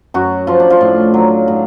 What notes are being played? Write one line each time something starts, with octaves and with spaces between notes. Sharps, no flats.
F#2 F#4
F3 F4
D4
F4
A2
F#3
A2